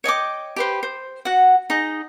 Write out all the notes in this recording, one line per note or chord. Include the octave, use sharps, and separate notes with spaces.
C#5 D#5 G5 D6
G4 B4 C5
C5
F#4 F#5
D#4 G#4 D#5